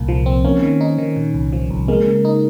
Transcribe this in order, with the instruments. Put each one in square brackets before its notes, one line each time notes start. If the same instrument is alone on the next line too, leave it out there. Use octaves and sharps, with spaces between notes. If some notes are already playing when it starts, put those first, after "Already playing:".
Already playing: [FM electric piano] C2 A#2 A#3
F3
C4
[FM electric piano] A#3 [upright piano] C#4
[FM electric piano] D#3
D#4
D#3
A#2
C2
F3
C2
[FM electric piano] G#3 [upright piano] A#3
[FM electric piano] C#3
D#4